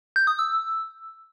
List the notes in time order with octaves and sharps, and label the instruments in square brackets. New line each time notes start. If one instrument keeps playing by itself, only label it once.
[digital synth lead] G6
D#6
E6